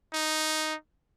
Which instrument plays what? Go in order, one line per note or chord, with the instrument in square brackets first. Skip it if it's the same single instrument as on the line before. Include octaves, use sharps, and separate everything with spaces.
[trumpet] D#4